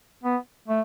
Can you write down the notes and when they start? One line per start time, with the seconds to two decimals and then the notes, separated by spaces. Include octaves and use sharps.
0.24 B3
0.68 A3